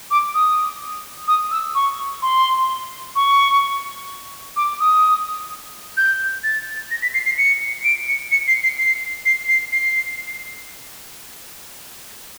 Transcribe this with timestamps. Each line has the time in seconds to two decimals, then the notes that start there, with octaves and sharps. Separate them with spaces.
0.11 D6
0.34 D#6
1.28 D#6
1.51 E6
1.75 C#6
2.22 C6
3.16 C#6
4.56 D6
4.80 D#6
5.97 G6
6.44 A6
6.91 A#6
7.02 B6
7.14 C7
7.26 C7
7.38 C#7
7.84 D7
8.08 C#7
8.31 C#7
8.48 C7
8.63 C7
8.78 C7
9.25 C7
9.48 C7
9.72 C7